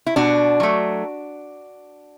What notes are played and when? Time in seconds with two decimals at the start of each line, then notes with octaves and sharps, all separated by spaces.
0.06 E4
0.16 B2 D4 F#4
0.60 F#3 A3